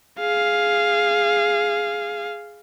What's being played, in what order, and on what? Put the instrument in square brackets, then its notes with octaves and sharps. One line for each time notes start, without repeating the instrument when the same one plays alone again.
[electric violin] G#4 F5